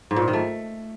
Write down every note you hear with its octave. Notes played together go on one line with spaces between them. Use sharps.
G#2
A#2
G#2
D#3
A3